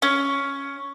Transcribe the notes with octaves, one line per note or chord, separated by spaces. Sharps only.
C#4